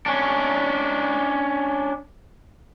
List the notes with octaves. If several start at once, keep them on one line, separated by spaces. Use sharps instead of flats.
C#4 D4